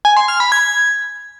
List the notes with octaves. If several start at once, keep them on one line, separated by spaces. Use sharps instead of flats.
G#5
C6
F6
B5
G#6